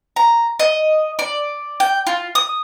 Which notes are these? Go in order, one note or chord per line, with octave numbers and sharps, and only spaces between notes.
A#5
D#5
D5
G5
F4
D#6